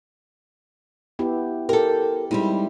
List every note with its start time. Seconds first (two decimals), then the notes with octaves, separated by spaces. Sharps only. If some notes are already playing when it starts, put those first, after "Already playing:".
1.19 B3 E4 G4
1.69 G4 A4 A#4
2.31 G3 G#3 C4 D#4 E4